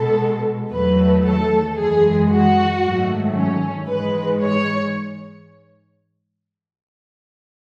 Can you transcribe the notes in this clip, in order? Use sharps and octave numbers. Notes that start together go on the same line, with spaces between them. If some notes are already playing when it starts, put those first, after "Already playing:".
Already playing: B2 G#3 A4
E2 D#3 F#3 A3 B4
A4
F#2 E3 G#3 G#4
F#4
G#2 D#3 F#3 A3
C#4
G#2 E3 G#3 B4
C#5